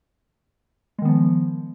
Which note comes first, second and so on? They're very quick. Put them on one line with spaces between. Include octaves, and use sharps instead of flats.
G#3 D#3 B3 F3